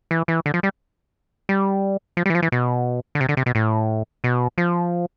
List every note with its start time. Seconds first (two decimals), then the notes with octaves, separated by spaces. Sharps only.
0.11 E3
0.28 E3
0.46 D3
0.54 F3
0.63 G3
1.49 G3
2.17 F3
2.26 G3
2.30 E3
2.35 F3
2.42 E3
2.52 B2
3.15 D3
3.20 C3
3.29 D3
3.37 C3
3.46 B2
3.55 A2
4.24 B2
4.58 F3